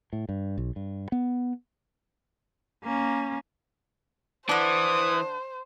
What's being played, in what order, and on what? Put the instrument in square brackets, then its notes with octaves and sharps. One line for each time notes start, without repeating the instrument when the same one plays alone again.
[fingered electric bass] A2
G2
B1
G2
B3
[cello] A#3 C#4
[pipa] D3 D4 [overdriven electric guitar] E3 [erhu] C5 [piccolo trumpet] D#6